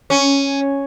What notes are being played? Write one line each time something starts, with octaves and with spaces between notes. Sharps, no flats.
C#4